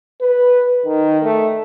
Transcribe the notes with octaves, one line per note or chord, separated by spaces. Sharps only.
B4
D#3
A3